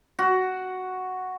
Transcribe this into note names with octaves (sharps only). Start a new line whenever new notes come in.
F#4